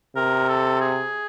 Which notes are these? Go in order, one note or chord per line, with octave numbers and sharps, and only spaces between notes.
C3 A#4
A4
G#4